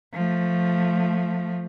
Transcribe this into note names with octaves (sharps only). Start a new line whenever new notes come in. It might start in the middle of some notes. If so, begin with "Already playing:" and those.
F3 A3